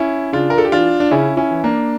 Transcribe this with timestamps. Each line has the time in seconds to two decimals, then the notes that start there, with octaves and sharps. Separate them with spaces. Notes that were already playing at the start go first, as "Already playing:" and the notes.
Already playing: C#4 E4
0.33 C#3 D4 F4
0.50 A#4
0.58 A4
0.65 G4
0.72 E3 D4 F4
1.00 D4
1.11 C#3 C#4 E4
1.37 C#4 E4
1.51 E3
1.64 A#3 D4